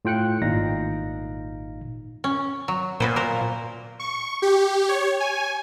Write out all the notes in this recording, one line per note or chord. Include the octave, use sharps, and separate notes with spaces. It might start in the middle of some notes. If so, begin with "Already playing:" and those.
A2 F4 G5 F#6 C#7
G#1 A#2 D#4 F5 A#6
C#4
F#3
A#2 B3 B4 C5
A#4 C5
C#6
G4
C#5
G#5